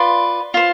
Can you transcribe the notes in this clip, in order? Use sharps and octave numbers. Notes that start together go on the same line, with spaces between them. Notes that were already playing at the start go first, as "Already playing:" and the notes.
Already playing: F4 B4 D5 C6
F4 C5